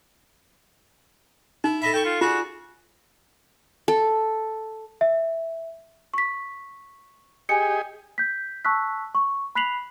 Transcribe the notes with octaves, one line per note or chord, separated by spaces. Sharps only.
D#4 E4
A4 D#5 E5 B5
A4 G5 C#6
F4
D4 F4 F#4 G#4
A4
E5
C#6 B6
G4 G#4 D#5 G#5 C#7
G6 B6
A5 C#6 E6 F#6 B6
C#6
B5 F#6 B6 C7 F7 F#7